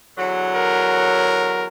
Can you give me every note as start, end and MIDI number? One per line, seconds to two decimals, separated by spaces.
0.17 1.67 40
0.17 1.67 50
0.17 1.67 54
0.55 1.67 70